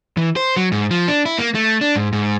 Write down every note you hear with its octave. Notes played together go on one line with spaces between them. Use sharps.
E3
C5
F#3
G#2
F3
D4
E4
A#3
A3
D4
G#2
G#2